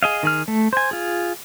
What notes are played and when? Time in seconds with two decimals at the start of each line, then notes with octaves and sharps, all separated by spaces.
0.03 G#4 D#5 F5
0.23 D#3 G#4 F6
0.48 A3
0.73 C5 G#5
0.91 F4 G#4